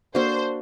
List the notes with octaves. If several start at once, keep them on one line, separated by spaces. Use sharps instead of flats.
A#3 D4 F#4 A4 C5